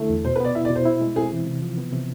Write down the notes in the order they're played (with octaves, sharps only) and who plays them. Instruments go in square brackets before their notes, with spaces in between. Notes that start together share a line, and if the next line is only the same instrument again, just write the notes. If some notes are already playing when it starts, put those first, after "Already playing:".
Already playing: [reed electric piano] D3 A3 E4
E2
[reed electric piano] B2 [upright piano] C5
[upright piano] B4
[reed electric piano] B3 [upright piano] D5
[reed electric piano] E4 [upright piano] E5
[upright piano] D5
[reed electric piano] B2
[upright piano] C5
[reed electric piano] E4
G#3
[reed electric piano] C4 [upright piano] G#4
[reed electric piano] E3
C3
F3
B3
C3